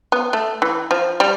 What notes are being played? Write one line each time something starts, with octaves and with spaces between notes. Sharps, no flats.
B3
A3
E3
F3
G3